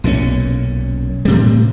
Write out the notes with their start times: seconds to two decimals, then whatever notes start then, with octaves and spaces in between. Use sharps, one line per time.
0.04 B1 A#2 D3 C#4
1.25 A2 C3 G3